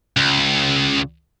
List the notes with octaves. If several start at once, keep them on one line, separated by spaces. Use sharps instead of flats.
C#2